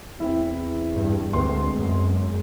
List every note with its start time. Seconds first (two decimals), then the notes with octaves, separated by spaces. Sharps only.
0.20 E2 C4 E4
0.96 G2
1.33 D2 G#3 B3 C4 C6
1.79 F#2